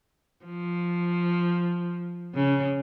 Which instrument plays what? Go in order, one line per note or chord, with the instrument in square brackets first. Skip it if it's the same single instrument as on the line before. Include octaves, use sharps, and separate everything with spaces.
[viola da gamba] F3
C#3